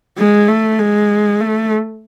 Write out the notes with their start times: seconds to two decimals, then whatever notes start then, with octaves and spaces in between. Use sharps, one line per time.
0.18 G#3
0.49 A3
0.79 G#3
1.41 A3